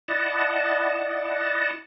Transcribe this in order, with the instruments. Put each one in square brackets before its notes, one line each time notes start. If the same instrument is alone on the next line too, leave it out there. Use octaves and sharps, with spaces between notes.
[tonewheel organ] E4 D5 D#5 F#5 A5